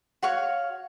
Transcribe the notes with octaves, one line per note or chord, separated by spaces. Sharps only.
F#4 C#5 F5